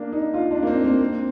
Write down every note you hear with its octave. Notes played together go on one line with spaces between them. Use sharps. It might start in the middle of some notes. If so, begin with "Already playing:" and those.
Already playing: A#3 D4
D#4
F4
D4
A#3
C4
A#3
C4